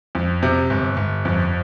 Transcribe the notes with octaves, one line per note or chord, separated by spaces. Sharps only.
F2
C3
G1
G1
F2